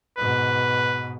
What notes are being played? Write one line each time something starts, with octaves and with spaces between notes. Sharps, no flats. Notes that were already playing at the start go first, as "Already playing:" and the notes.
G#2 B2 B4